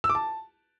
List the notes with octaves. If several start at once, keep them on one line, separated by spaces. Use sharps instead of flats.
E6
D6
A5